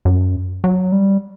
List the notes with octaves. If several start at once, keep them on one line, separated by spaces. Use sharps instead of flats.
F#2
F#3
G3